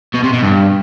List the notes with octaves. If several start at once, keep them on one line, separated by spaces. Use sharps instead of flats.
B2
C3
B2
G2